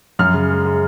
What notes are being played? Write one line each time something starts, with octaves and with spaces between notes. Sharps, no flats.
F#2 F6
C#3
G#3
G#3